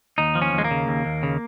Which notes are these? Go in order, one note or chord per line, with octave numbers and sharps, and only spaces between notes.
D#2 D#4
F3
C#4
D#2 G#3
A#3
C#3
D#2
D#2
C#3